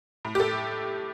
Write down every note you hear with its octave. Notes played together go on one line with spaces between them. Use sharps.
A2
G4
A2 A4